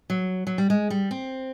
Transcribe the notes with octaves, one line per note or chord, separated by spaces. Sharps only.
F#3
F#3
G3
G#3
G3
C4